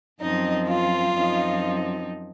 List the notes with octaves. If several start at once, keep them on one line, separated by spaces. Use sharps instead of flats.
F#2 F3 C4 D#4 D#5
F4 F5
F#2 F3 C4 D#4